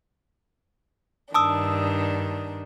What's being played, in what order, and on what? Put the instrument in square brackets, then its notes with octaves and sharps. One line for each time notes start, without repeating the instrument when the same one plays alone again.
[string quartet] G2 D#3 D4 [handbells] A5 D#6 E6